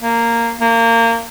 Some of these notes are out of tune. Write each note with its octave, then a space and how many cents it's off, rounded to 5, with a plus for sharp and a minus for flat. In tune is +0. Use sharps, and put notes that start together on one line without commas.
A#3 -10
A#3 -25